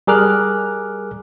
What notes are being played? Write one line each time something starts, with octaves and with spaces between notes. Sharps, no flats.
G3 G#4 A#4 D6 F6 F#6